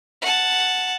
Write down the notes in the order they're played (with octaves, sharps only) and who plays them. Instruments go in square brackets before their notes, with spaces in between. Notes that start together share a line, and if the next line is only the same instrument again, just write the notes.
[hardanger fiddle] F#5 A5